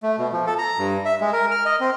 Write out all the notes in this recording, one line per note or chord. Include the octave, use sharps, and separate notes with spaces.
A3
B2
F3
A4
A#5
G2
E5
G#3
A#4
F6
D#5
C4